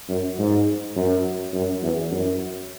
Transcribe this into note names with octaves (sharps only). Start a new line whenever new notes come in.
F#2
G#2
F#2
F#2
E2
F#2